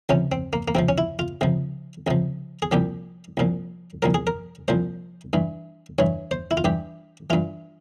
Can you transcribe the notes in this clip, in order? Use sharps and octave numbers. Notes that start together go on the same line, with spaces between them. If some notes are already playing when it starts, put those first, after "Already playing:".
C#2 C3 F3 C#4
C4
A#3
A#3
C#2 C3 F3 C4
C#4
E4
F4
C#2 C3 F3
C#2 C3 F3
G#4
C2 A#2 F3 G4
C2 A#2 F3
C2 A#2 F3 A#4
G#4
A#4
C2 A#2 F3 C5
G2 E3
G2 E3 C#5
C5
E4
F4
G2 E3 G4
G2 E3 F4